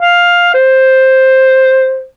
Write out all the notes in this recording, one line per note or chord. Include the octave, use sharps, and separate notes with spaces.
F5
C5